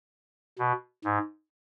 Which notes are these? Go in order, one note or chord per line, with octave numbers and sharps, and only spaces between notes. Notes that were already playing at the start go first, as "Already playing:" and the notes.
B2
G#2